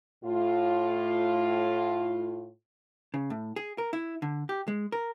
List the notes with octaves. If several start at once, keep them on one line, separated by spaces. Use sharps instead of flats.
A2 F4
C#3
A2
G#4
A#4
E4
D3
G4
G#3
A#4